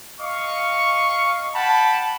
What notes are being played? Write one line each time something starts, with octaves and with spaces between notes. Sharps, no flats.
D#5 F5 C#6
F#5 G5 A5 B5